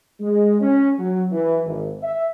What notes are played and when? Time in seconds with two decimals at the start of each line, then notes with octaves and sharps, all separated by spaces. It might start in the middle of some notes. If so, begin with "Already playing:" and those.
0.19 G#3
0.61 C#4
0.99 F#3
1.31 E3
1.65 G#1
2.02 E5